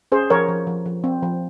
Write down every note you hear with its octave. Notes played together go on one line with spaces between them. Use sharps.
C#4 G#4 C5
F3 A#4 C#5
F3
F3
F3
C4
F3